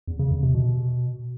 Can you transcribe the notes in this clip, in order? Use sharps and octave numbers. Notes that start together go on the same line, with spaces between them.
E2
C#3
E2
C3
B2